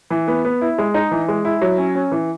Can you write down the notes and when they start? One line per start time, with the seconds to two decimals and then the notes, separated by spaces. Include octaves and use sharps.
0.10 E3
0.28 B3
0.45 B3
0.62 E4
0.78 G#3
0.94 D#4
1.11 E3
1.28 G#3
1.45 E4
1.62 F#3
1.78 C#4
1.95 C#4
2.12 E3